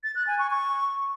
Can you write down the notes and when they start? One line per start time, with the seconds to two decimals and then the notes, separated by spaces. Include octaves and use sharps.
0.04 A6
0.15 F#6
0.27 G#5
0.39 C#6
0.50 C#6